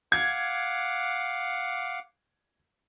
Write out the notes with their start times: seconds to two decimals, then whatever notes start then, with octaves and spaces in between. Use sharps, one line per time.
0.12 F5 F#5 D6 G#6